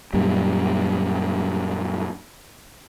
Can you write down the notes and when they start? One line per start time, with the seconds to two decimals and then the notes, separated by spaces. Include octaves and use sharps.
0.13 F#2 A#2 G3